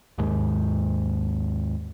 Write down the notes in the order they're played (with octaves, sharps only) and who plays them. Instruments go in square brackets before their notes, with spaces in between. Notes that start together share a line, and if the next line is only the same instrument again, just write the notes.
[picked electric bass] D#2 G#2